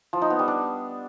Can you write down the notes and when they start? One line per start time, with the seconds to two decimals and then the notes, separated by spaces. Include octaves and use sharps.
0.13 F3
0.22 D#4
0.30 B3
0.39 G3
0.48 D4